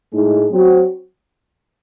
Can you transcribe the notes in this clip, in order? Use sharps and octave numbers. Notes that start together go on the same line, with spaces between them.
A2 G#3 D#4
F#3 C4 F#4